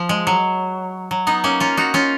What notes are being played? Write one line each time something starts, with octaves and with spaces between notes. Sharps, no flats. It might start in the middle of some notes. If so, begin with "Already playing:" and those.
Already playing: F3
G#3
F#3
F#3
B3 D#4
A#3 C#4
C#4 F4
D#4 F#4
C#4 F4